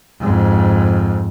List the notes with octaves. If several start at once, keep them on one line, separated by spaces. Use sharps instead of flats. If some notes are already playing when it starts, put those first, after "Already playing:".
F2 G#2